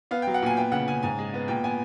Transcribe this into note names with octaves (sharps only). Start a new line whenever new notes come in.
B3 F5
F#3 G5
F#5
A#2 G#5
B3 G5
C#3 F#5
C#3 G#5
G#2 G#5
G#3
B3
A#2 G5
B3 G#5